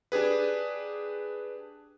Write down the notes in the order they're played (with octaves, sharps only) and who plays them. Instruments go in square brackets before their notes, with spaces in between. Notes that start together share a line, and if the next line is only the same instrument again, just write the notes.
[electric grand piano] D4 G4 G#4 B4